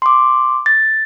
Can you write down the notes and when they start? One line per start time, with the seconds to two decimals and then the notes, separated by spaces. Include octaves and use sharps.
0.02 C6 D6
0.66 A6